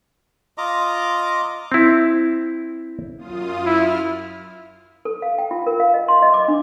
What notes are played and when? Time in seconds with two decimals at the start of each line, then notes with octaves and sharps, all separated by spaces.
0.58 F4 D#5 A#5 D6
1.72 C4 E4
3.18 F#2 F4 D#6
3.66 E4 F6
5.05 A4
5.22 F5
5.38 G5
5.51 F4
5.66 A#4
5.80 F5
5.94 D#5
6.08 C6
6.22 D#5
6.34 D6
6.48 D4